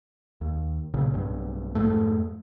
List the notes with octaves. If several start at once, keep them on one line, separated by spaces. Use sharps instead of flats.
D#2
B1 A#2 C#3
B1 G2
F2 G#2 A3